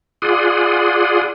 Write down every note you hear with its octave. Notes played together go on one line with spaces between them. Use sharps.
F4 G#4 D5 F#5 C6 D#6